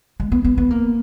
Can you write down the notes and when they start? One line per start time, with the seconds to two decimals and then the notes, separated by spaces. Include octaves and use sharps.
0.20 G#3
0.32 B3
0.44 B3
0.58 B3
0.70 A#3